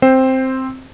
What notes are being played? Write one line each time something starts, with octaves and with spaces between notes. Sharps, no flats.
C4 C5